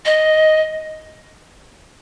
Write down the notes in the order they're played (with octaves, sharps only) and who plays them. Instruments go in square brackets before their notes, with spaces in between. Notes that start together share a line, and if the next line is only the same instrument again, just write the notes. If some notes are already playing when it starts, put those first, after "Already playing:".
[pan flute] D#5